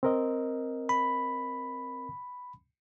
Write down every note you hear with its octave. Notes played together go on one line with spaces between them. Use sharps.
C4 A#4 D#5
B5